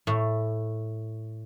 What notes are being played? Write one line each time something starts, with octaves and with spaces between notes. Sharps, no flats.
A2